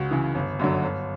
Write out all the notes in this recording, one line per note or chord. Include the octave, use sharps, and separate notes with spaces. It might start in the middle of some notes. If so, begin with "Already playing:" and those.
Already playing: C#2 F#4
C#3 E3
G1
F#2 D3 F#3
G1